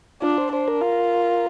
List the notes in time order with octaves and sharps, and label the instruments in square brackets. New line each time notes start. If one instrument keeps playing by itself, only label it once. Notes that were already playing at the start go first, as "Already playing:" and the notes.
[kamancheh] D4 [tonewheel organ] F4
[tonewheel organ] C5
[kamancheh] D4 [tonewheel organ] C5
[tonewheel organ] A#4
[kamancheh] F4